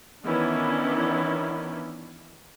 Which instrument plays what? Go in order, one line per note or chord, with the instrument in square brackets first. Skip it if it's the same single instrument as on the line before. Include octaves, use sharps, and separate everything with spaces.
[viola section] D#3 E3 B3 C#4 D4 E4